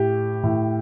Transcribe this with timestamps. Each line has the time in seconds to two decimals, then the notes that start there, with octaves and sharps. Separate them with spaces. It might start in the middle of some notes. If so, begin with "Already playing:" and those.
Already playing: A2 G4
0.44 A2